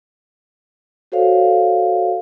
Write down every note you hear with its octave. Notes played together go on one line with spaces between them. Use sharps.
F#4 A4 C5 C#5 F5